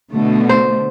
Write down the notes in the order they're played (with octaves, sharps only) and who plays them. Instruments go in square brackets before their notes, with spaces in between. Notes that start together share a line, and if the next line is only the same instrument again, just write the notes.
[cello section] B2 D3 A3
[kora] C5